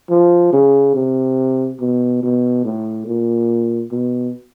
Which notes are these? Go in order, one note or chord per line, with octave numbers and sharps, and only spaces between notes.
F3
C#3
C3
B2
B2
A2
A#2
B2